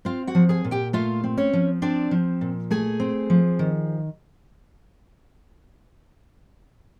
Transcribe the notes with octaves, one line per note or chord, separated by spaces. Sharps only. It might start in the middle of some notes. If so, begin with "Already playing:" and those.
C4 F4 F5
F#4 F#5
F3
G#4 G#5
A#2
G4 G5
A3 F4 F5
C4
C#4 C#5
F3
C4 D4 D5
F3
A#2
A3 G#4 G#5
C4
F3
D#3